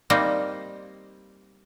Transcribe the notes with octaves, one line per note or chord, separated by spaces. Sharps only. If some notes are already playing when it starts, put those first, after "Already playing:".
G3 A#3 C4 D#4